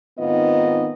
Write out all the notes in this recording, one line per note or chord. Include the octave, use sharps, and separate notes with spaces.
G#2 D#3 B3 C4 F4 D#5